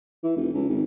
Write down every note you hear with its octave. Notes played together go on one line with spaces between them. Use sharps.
E3
F1
C#2
G#1